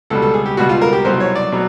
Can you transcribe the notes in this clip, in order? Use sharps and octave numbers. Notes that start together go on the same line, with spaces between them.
C#2 B2 G3 A4
A4
G#4
G4
C#2 B2 G3 F#4
F4
A#4
G4
C2 B2 F#3 C5
C#5
D5
B2 F#3